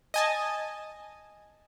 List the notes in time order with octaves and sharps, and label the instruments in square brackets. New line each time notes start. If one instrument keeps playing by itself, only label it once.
[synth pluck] D#5 G#5 A5